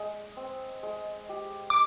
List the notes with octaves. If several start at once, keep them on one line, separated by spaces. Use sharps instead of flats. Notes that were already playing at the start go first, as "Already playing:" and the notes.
Already playing: G#3
C4
G#3
G4
D6